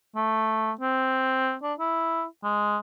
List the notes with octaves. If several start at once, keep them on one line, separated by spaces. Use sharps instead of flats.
A3
C4
D4
E4
G#3